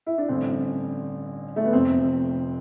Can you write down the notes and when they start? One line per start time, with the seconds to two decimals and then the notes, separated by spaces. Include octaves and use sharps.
0.06 E4
0.18 D4
0.29 A1 G2 D3 C4
1.56 A3
1.65 B3
1.73 F1 F2 C3 C4